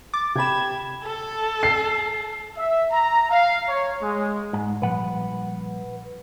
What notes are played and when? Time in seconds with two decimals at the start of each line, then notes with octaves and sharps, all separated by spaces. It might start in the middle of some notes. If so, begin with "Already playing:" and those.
0.14 D6 A6
0.36 C3 G5 B5 G#6 E7
1.04 A4
1.63 C7
2.57 E5
2.91 A#5
3.31 F5
3.68 C#5
4.01 G#3
4.53 G#2
4.82 A#2 F3 G3 B4 F#5